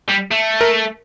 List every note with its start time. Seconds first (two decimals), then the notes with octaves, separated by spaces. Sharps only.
0.09 G3
0.31 A3
0.61 A#4